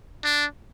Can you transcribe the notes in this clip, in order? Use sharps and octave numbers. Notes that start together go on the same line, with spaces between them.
D4